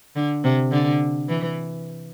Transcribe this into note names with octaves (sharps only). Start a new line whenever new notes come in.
D3
C3
D3
E3